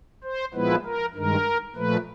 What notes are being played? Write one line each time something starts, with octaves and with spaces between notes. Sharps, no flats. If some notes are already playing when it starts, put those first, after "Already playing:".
C5
A#2 F3 G#3 B3 E4 B4
A#4
G2 D#3 G#3 A#4
A#2 F3 A3 B4